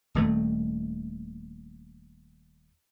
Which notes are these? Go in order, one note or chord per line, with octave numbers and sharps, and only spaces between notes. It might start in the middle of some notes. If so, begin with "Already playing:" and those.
D#1 D#2 A3